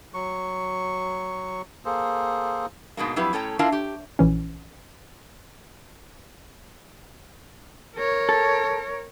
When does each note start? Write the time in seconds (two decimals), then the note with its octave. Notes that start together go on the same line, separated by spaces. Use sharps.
0.14 F#3 C#6
1.85 A#3 G#4 A4 C5
2.97 G#2 B2 G#3 A#3
3.16 F2 F#3 E4 G4 B4
3.33 A2 C#4 A4 C#5 G5 A#5
3.59 D4 E4 F4 A#4 F5 A5
3.72 G4
4.19 A#1 E3 C#4
7.96 A#4 C#5
8.29 A4